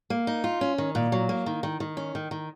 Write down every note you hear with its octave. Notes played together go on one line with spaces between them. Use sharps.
A#3
D#4
F4
C#4
D#3
A#2
F#3
A#3
D#3
D#3
D#3
C#4
D#3
D#3